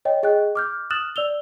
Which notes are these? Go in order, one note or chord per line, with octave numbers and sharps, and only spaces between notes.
C#5 D#5 G5
G#4 D#5 G5 F#6
D6 F6 G6
D#6 F6 F#6 A6 E7 F#7
D5 E6 F7 G7